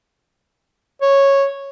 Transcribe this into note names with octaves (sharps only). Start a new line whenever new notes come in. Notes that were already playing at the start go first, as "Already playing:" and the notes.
C#5